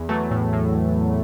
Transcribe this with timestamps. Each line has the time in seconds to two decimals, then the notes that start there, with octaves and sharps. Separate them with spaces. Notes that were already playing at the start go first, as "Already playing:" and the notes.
Already playing: E2
0.09 E3 F#3 A3
0.31 A2
0.53 A2